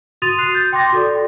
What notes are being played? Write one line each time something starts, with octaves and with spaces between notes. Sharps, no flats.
F#4 C6 D#6 A6 D#7 F7
D#6 F#6 C7 D#7
G6 A6
G5 C6 D6 A6 A#6
F#4 A4 D5